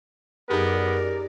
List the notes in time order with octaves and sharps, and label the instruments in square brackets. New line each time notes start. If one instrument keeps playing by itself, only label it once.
[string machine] F#2 D5 [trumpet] B3 [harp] D#4 G4 G#4 [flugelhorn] A#4